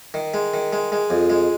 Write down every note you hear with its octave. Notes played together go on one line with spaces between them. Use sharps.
D#3
G#3
D#3
G#3
G#3
F2
G#3